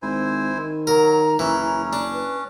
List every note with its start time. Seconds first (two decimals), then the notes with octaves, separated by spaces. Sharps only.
0.02 G#1 E4 C5 G#5
0.57 D#3
0.87 F#3 A#4 A#5
1.39 F#1 E3 C#4
1.93 D4
2.13 B4